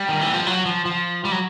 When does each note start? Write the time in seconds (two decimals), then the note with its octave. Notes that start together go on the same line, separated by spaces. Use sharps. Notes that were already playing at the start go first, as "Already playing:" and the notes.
Already playing: G3
0.09 D#3
0.21 E3
0.34 F3
0.46 F#3
0.65 F3
0.85 F3
1.25 G3
1.32 F#3